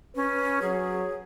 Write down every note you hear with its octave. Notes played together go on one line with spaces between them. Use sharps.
C#4 B4
F#3 G#4